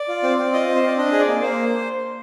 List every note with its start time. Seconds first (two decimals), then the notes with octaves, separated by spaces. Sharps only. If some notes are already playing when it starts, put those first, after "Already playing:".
Already playing: D5
0.08 F4
0.23 C4
0.39 C4
0.53 F4 D#5
0.68 C4
0.76 C5
0.83 C4 D5
0.98 D4 D#5
1.12 G#4
1.20 D5
1.28 A#3
1.42 A#3 C5